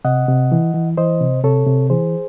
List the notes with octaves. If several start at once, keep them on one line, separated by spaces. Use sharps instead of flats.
C3 D#5 F#5
C3
E3
E3
E3 C5 D#5
C3
C3 A4 C#5
C3
E3 G#4 C5